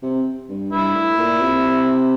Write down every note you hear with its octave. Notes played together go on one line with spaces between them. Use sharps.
C3
G2
G2 E4
A2
A#2
C3